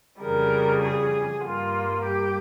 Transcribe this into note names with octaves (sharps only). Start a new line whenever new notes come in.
F2 C#3 G3 A#4
G#4
G2 G3 A#3 F4
G4